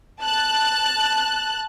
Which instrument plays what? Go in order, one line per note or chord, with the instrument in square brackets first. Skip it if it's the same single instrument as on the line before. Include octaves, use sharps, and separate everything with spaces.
[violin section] A5 F#6